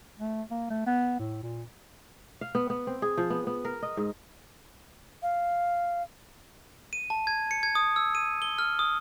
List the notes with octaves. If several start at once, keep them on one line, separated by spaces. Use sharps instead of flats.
A3
A#3
A3
B3
A2
A#2
F5
B3
B3
C4
G#4
F3
B3
B3
A#4
D#5
G#2
F5
D#7
A5
G#6
C#7
G#6
D#6
E6
D#7
G7
F6
D#6